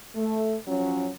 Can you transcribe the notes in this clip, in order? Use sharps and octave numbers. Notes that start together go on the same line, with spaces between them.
A3
F3 F#3 C#4